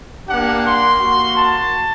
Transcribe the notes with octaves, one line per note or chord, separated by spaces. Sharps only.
A#3 D4 G4 F#5
C6
A#3 F#4
A5